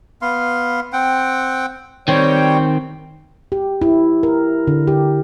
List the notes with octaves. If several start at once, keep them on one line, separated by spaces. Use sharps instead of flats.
B3 F5 C6
C4 F#5 G5
D#3 G3 C4 C#5 G5
G4
E4
A#4
D3
G4